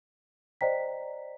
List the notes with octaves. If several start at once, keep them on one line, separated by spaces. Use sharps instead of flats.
C5 D5 D#5 G5 A#5 B6